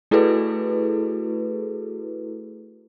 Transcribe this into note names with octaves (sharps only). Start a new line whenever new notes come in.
A3 E4 F#4 G#4 A4 B4